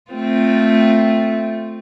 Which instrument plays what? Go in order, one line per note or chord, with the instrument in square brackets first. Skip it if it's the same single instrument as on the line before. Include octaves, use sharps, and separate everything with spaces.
[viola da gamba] A3 C4 F4